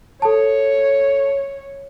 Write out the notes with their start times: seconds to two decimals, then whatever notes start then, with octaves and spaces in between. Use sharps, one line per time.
0.22 A4 C#5 A5